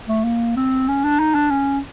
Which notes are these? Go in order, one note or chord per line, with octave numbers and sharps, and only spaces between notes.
A3
A#3
C4
C#4
D4
D#4
D4
C#4